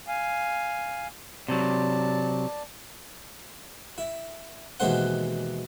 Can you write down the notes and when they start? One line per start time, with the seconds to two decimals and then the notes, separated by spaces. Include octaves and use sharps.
0.08 F5 G#5
1.48 C3 F#3 D5 A5
3.98 E4
4.80 D#2 B2 E3 G#3 C5 F#5